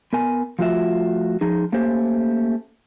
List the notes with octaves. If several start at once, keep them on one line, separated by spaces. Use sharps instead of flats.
B3 A#4 G#5
F3 A3 F4 F#4 E5
F3 D#4 G#4
A3 A#3 C#4 G4 C5